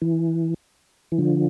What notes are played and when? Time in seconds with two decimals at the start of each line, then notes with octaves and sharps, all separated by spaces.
0.02 E3
1.12 E3
1.18 D3 F3